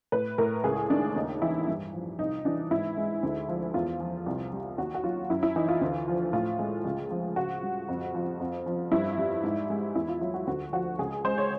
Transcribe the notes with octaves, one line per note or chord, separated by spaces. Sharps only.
A2 B4
A2 A#4
C#2 G#4
D#3 D4
D#2 D#4
E3 E4
G2
F3
C2 D#4
E3 D4
G#2 E4
G#3
D2
F3
E2 F4
F3
C2
G3
D#2 F#4
F#4
F#3 F4
F#2 E4
E4
E3 D#4
F4
D2
F3
A2 F4
G#3
C#2
F3
C#2 F#4
G3
F2
F3
F2
F3
G2 E4
G3
G#2
G#3
E2 E4
F4
F#3 F4
F#4
D2 F#4
F3 F#4
C#2 G#4
G#3 C5
C#5